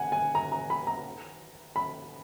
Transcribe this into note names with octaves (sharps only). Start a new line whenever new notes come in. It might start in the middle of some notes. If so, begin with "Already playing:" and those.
Already playing: F#5 G#5
G#5
A#5
A#5
B5
A#5
B5